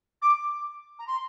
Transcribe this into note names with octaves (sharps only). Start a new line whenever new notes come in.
D6
A#5
C6